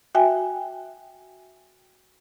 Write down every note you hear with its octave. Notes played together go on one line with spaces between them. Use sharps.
F#4 E5 G5 G#5